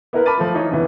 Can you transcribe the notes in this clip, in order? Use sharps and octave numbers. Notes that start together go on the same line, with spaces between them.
B3 E4 A#4 B4
A5 B5 D6 F6 A6 D#7
F3 A3 F4
E3 D#4 E4 C#5
F1 D2 E3 B3